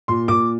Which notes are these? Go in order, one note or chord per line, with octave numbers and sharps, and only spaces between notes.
A#2 C6
A#2 D6